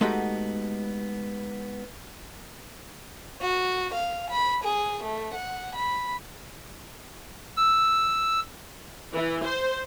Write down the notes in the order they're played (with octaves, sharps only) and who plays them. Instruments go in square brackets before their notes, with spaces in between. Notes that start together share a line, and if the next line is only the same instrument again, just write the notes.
[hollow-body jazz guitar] G#3 A3 B3 D#4 F#4 G4
[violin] F#4
F5
B5
G#4
A3
F#5
B5
[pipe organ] E6
[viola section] E3
C5